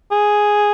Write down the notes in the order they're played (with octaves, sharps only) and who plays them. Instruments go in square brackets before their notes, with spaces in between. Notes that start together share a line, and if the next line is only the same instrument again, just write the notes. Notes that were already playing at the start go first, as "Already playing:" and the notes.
[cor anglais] G#4